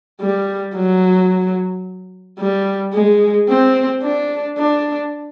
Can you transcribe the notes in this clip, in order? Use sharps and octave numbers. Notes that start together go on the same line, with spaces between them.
G3
F#3
G3
G#3
C4
D4
D4